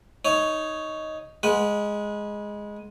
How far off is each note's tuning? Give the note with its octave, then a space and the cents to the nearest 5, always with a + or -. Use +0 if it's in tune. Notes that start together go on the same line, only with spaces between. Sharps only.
D#4 +5 C#5 +5
G#3 +0 B4 -30 F#5 +0